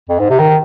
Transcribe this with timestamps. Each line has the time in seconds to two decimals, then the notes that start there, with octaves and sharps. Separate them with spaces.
0.09 F2
0.19 G#2
0.30 C3
0.39 D#3